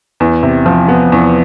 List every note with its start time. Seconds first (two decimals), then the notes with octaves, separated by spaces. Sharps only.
0.20 E2
0.43 C3
0.66 F3
0.88 B3
1.12 E2